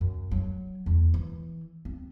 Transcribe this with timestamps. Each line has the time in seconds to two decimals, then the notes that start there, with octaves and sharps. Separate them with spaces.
0.01 F#2
0.31 F#3
0.86 E2
1.14 E3
1.85 C4